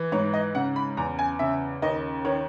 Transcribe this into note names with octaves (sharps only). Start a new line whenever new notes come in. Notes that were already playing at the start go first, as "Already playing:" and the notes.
Already playing: E3
G#2 C#5
D#5
C#3 F#5
B5
E2 A#5
G#5
C#3 E5
D#2 D#5
D#3 C#5